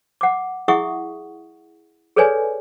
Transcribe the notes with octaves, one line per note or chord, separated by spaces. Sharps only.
F#5 D6
E4 G#4 E5 F#5 C#6 D#6
G#4 A4 B4 C#5 D5 G#5